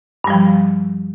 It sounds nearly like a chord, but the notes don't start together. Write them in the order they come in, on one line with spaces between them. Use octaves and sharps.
G2 G3 F3